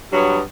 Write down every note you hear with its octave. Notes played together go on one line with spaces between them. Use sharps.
G2 F#3 B3